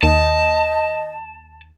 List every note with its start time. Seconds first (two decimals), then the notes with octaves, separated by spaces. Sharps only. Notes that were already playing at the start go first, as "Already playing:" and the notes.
0.03 D#2 D#5 A5